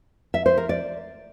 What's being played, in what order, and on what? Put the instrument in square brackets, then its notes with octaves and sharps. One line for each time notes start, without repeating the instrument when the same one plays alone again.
[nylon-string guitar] E5
C5
A#4
D5